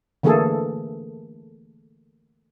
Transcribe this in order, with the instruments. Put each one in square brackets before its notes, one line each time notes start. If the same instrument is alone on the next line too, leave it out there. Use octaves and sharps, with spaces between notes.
[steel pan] D3 E3 A3 A#3 G#4 A4